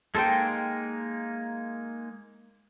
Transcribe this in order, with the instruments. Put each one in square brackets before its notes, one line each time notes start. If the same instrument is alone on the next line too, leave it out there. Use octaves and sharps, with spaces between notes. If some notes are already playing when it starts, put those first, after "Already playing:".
[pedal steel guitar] G#3 A#3 D#4 [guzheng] A4 C5 G5